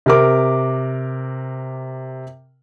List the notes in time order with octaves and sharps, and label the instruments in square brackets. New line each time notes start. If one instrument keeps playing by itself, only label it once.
[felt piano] C3 A#4 D6